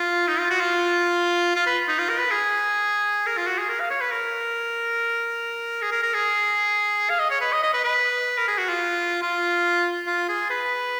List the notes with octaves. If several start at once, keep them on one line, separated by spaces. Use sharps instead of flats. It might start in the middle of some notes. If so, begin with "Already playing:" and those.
Already playing: F4
D#4
F4
F#4
F4
F4
B4
D#4
F4
A#4
B4
G#4
A#4
F4
F#4
G#4
A#4
F5
C#5
B4
A#4
G#4
A#4
A#4
G#4
F5
D#5
C#5
B4
D#5
D#5
B4
B4
A#4
G#4
F#4
F4
F4
F4
G#4
B4